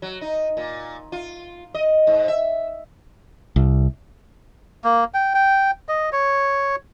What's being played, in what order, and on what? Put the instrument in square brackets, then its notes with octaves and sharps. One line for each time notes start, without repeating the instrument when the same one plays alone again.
[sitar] F#3
D#4
A#2
F4
D#5
G#2
E5
[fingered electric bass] C2
[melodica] A#3
G5
G5
D#5
C#5